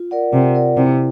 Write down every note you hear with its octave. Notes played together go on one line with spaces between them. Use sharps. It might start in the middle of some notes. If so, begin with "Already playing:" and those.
Already playing: F4
A#4 D5 F#5
C3 F4
A#4 D5 F#5
C3 E4